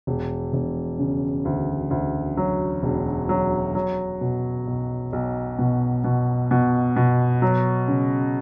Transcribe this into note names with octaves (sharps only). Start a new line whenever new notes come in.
E1
E1
C#3
D2
D2
F#3
E1
F#3
F#3
B2
B1
B1
B2
B2
B2
B2
F#3
C#3